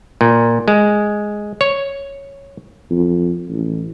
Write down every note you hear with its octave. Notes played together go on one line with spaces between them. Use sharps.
A#2
G#3
C#5
F2
A1